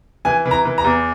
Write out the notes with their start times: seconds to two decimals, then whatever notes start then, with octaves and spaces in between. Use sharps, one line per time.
0.25 E3 G#5
0.46 E3
0.51 A#5
0.65 E3
0.78 A#5
0.84 E2